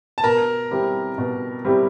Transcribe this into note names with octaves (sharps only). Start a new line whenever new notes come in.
A5
B2 A#4 A#5
G3 C4 E4 G4
B2
G3 C4 E4 G4